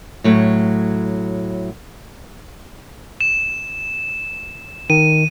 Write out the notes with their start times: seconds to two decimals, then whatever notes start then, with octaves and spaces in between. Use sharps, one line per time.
0.24 A2 F#3 A3
3.21 E7
4.90 D#3 D#7